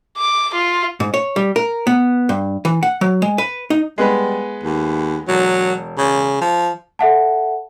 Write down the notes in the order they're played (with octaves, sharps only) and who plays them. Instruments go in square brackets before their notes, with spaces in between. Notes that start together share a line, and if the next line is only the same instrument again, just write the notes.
[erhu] D6
F4
[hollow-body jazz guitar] G#2
C#5
G3
A#4
B3
G2
E3
F#5
F#3
G#3
B4
D#4
[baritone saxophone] G3 [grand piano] G#3 B3 B4
[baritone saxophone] D#2
[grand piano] E1 [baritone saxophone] F#3
[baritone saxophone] C#3
F3
[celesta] A4 E5 F#5 A5